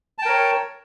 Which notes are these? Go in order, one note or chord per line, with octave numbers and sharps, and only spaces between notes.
A#4 C#5 G5 A5